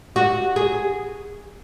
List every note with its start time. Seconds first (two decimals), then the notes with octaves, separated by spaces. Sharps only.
0.16 F#4
0.56 G#4